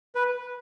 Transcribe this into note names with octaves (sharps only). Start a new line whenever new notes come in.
B4